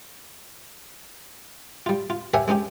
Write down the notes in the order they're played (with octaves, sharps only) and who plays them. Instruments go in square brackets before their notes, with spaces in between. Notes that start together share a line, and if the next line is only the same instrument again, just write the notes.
[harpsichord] G3 F4
F4
G4 A#4 C#5 E5 F#5 G#5
G#3 C#4 D#4 G4